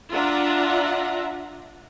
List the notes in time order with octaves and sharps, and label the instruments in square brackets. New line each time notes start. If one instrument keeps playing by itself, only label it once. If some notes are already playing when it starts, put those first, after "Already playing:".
[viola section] D4 F4 E5 F#5 A#5